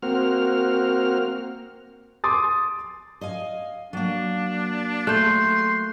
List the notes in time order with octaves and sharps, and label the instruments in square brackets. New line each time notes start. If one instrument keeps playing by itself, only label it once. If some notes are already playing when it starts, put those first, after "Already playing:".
[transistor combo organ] A#3 C4 F#4 F6
[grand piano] C6 D6 D#6 A6
[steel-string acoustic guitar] D#5 F5 G#5
[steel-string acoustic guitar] F#3 A#3 [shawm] D4
[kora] A3 [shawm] C6 [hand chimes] F#6 G6